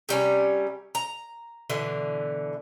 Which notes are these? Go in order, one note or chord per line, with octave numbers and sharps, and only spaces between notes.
C3 G3 C#4
A#5
B2 D3 E3